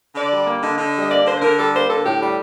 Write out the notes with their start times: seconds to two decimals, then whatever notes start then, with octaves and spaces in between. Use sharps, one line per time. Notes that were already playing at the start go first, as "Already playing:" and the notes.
0.15 D3 D5
0.31 G3
0.46 A#3
0.62 D3 D#5
0.78 D3
0.94 G3
1.00 D#5
1.10 A#3 D5
1.26 D3 C5
1.37 C5
1.41 D3 A#4
1.57 G3 A4
1.73 A#3 C5
1.89 D3 A4
2.05 A2 G4
2.20 G3